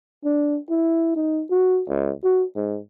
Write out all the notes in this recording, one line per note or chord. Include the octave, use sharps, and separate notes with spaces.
D4
E4
D#4
F#4
C#2
F#4
G#2